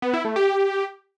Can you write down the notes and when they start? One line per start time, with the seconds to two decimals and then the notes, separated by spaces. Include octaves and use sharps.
0.02 B3
0.14 E4
0.25 A3
0.36 G4